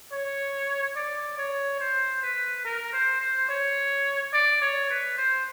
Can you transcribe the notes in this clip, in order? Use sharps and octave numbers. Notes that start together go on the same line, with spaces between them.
C#5
D5
C#5
C5
B4
A#4
C5
C5
C#5
D5
C#5
B4
C5